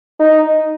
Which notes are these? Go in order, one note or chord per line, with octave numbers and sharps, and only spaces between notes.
D#4